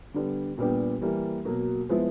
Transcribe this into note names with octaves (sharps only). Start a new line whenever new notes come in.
D3 G3 B3 D4
A#2 G3 B3 D4 G4
E3 G3 A#3
B2 F#3 A#3
F3 G#3 B3 E4